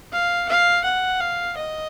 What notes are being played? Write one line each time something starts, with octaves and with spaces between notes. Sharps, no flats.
F5
F5
F#5
F5
D#5